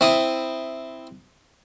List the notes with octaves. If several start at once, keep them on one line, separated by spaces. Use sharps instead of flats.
C4 E4 D#6